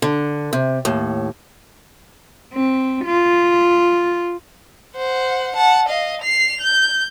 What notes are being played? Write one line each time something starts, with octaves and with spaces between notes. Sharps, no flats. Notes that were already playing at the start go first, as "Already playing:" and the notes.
D3
C3
D#2 A2
C4
F4
C5 F#5
F#5 A5
D#5 F5
C7 F7
G6